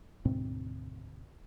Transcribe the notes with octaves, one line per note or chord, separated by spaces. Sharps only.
D2 G#2 B2 C4